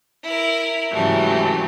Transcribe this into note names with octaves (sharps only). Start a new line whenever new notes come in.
E4 A#4
G#2 C#3 E3 F#3 G3 A3